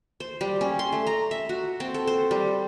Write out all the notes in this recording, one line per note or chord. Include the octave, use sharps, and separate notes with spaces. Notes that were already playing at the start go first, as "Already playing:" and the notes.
C5
G3
C#4
C6
A3
A#5
E5
F#4
C4
A4
C5
G3